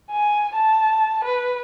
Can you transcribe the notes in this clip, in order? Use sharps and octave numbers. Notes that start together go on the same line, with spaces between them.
G#5
A5
B4